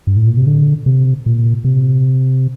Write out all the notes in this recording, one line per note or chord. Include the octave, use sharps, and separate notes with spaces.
G2
A2
A#2
C3
D3
C3
A#2
C3